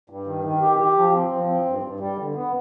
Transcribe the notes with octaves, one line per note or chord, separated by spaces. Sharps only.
G2
D#3
D#3
G4
G4
F3
C4
F3
C4
G2
G2
G3
D3
B3